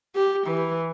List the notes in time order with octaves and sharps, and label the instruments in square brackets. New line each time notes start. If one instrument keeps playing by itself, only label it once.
[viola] G4
E3